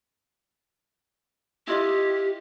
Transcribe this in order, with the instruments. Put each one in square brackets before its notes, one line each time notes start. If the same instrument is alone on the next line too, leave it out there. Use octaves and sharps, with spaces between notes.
[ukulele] E4 F4 D#5 [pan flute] G4